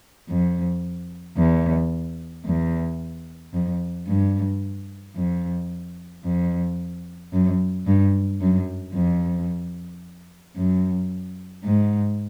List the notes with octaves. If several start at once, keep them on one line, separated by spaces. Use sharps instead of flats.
F2
E2
E2
F2
G2
F2
F2
F#2
G2
F#2
F2
F#2
G#2